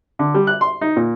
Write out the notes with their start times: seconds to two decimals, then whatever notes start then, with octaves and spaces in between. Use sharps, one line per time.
0.19 D3
0.34 G3
0.47 F#6
0.61 C6
0.81 D#4
0.97 A#2